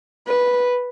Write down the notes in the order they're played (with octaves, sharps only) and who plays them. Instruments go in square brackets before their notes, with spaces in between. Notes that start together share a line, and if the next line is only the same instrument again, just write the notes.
[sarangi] B4